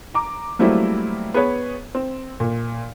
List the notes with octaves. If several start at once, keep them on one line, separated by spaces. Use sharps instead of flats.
A#5 D6
F#3 G3 A3 A#3 C4 E4
B3 G#4 B4 C#5
C4
A#2